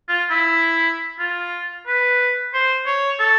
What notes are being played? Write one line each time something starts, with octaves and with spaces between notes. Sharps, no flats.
F4
E4
F4
B4
C5
C#5
A4